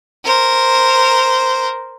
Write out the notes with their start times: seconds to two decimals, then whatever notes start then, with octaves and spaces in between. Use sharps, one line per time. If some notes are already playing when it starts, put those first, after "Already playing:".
0.25 A#4 C5